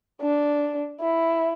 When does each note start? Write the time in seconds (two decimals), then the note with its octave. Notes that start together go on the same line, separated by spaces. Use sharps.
0.21 D4
1.01 E4